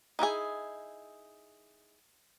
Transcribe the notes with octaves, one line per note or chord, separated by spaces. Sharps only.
D#4 E4 F#4 G#4